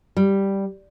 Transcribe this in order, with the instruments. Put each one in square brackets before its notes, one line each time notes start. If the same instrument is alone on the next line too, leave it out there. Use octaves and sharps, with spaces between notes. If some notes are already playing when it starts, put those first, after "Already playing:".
[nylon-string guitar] G3